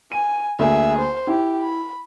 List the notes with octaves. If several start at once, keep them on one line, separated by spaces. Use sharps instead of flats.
G#5 D#7
D2 A#3 G#4 E5
C5
E4 G4
B5